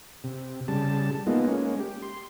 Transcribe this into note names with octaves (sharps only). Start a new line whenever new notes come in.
C3
C#3 G3 A5
G#3 A#3 B3 D#4 F4
G#3 A#3 C#4
G4
C6